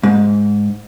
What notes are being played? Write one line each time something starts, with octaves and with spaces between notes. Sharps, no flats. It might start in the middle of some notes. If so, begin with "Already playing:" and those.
G#2